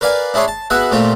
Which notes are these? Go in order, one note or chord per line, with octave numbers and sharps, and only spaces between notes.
A#4 B4 D5 F5 G#5
D4 E4 G#4 C#5 C6
A5
B3 F#4 G#4 E5 F#5
A#2 A3 C4 F4 G4